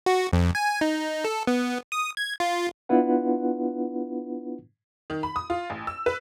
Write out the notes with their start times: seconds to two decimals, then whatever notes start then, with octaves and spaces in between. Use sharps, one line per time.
0.06 F#4
0.33 F2
0.55 G#5
0.81 D#4
1.24 A4
1.47 B3
1.92 D#6
2.17 G#6
2.40 F4
2.89 B3 D4 E4 F4 B4 F#5
5.10 D#3
5.23 B5
5.36 D#6
5.50 F4
5.70 A1
5.87 E6
6.06 B4